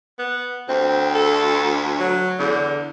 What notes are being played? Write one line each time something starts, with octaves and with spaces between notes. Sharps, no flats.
B3
D2 C4
A4
F#3
E2 D3